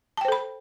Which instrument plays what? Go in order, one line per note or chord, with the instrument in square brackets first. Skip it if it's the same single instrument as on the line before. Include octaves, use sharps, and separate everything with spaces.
[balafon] A5
G5
C5
A4
B5